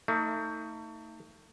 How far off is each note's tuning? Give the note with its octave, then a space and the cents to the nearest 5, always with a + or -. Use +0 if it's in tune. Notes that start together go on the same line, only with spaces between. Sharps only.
A3 +35 D#4 +25